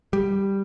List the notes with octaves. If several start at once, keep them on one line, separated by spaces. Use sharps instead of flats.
G3